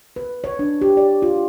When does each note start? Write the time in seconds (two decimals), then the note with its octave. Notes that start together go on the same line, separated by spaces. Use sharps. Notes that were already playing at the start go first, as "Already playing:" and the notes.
0.16 B4
0.44 C#5
0.59 D4
0.81 G4
0.97 D5
1.22 F4